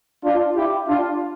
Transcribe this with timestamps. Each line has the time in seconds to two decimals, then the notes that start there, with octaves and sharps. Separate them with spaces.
0.24 D4 F4
0.56 E4 G4
0.88 D4 F4